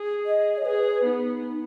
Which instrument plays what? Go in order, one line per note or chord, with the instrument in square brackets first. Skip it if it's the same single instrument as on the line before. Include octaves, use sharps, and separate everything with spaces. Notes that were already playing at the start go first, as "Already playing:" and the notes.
Already playing: [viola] G#4
[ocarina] D#5
C#5
[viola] G#4 [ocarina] B4
[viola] B3 [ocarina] D#4